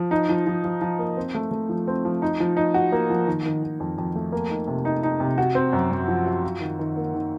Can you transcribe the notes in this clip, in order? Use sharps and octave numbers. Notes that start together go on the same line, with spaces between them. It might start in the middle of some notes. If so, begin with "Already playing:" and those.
Already playing: F3
D#4
F3
F3
F3
F3
A#3
C4
A3
A3
F3
C4
F3
D#4
F3
D#4
F#4
A#3
F3
D#3
D#3
D#3
F2
F2
A3
A#3
D#4
C3
D#4
D#4
C3
F#4
C4
F#2
F#2
F3
F#4
F4
D#3
D#3
A#3
D#3